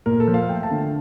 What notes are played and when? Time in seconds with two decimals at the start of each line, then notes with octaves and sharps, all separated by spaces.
0.06 A#2 A#4
0.20 A4
0.27 F3
0.34 F5
0.49 A3 G5
0.63 A5
0.70 D3